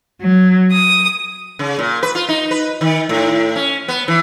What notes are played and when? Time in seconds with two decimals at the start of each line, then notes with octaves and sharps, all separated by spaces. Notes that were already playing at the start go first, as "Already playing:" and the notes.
0.21 F#3
0.72 D#6
1.59 C#3
1.79 A#2
2.03 B4
2.15 F4
2.29 D#4
2.51 B4
2.81 D#3
3.09 A2
3.56 C#4
3.88 B3
4.08 E3